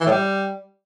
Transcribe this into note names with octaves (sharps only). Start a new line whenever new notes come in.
E3
A2
G3